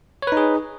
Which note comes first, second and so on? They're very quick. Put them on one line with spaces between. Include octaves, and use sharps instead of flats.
C#5 B4 D#4 G#4